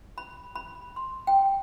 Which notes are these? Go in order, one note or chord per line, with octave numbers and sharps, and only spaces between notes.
B5
B5
C6
G5